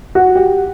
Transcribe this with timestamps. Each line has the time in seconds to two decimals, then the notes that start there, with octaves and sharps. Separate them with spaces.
0.15 F#4
0.36 G4